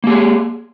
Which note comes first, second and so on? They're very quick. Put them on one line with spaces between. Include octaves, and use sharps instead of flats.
A#3 G4 G#4